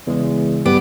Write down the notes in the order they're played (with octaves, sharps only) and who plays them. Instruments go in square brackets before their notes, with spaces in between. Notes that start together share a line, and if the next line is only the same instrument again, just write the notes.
[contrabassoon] E2 [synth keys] C#3 G#3
[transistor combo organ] G3 D6 [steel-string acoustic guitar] B3